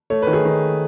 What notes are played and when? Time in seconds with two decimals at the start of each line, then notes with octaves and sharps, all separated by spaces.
0.10 A3 C#5
0.22 D#3 B4
0.33 G#4
0.45 D#3